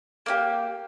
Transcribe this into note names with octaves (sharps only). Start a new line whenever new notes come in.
A#3 D#4 G4